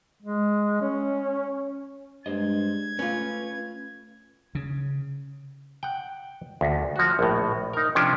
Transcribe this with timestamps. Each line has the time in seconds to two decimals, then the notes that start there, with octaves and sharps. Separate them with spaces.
0.22 G#3
0.82 C#4
2.26 G2 G#3 C5 D#5 G#6
2.99 A3 C#4 F4 B4
4.55 C#3
5.83 F#5 G5
6.61 D2
6.96 F3 F#4
7.19 A#1 A2
7.73 D#4 A#4
7.95 C3 F3 C#4 D4